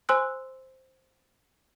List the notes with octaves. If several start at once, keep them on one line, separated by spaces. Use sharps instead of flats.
C5 G#5 C6 E6 F#6